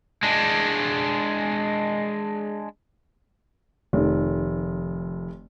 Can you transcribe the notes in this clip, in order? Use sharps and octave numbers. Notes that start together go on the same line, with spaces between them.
G#3 D4
F1 F2 D#3